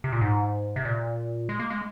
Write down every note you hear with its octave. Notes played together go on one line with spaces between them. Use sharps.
C3
A#2
G#2
C3
A#2
G#3
A#3
G#3